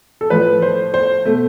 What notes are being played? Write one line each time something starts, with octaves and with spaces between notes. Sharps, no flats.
A4
A2 F3 A3 B4
C5
C5
B2 A3